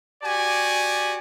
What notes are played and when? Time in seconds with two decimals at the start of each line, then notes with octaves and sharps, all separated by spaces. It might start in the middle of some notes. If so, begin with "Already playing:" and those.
0.23 F#4 G4 D5 G#5